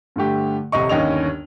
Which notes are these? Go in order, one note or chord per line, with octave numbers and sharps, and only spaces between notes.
G2 D3 A3 G4
D#1 C2 C3 D#5 C#6
G1 D#2 C#4 D#5 F7